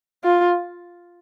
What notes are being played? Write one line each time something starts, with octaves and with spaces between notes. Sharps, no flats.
F4